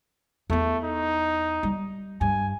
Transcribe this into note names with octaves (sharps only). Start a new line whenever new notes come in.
E2 A3 E4
D#4
G3
G2 G#5